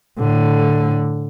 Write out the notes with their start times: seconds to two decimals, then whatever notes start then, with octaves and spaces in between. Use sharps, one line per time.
0.19 A2 D3